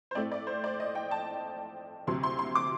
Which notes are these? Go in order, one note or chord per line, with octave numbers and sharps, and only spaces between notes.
C5
A2 A3 C4 D5
D5
C5
D5
D#5
G5
A5
D2 C3 F#3 C6
C6
C6
D6